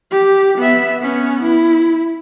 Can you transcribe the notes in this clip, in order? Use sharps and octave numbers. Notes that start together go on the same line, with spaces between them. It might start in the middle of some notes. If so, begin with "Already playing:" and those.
G4
B3 E5
B3 C#4
E4